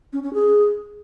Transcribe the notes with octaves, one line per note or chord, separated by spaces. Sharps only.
C#4
C#4
G#4